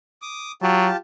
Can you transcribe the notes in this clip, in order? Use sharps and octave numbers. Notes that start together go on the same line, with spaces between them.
D6 D#6
F#3 F4 G4 A5